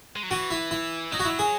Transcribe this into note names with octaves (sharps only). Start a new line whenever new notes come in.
G#3
F#3
E3 F#4
E4
E4
F#3 D#4
F#4
E4
G#4